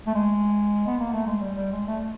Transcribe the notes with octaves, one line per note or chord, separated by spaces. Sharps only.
A3
G#3
B3
A#3
A3
G#3
G3
G3
G#3
A3